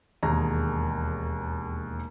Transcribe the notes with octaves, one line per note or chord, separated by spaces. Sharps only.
E1 D#2 G#4 A#5